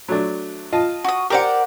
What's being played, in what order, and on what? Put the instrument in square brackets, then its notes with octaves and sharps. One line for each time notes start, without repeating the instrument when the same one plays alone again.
[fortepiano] F#3 A3 D4
F4 D#5 A5
[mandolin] F#4 D#6
[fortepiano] G4 C5 [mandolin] A#4 D5 F#5